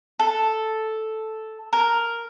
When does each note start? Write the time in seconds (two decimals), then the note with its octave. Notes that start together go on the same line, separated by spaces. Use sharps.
0.19 A4
1.73 A#4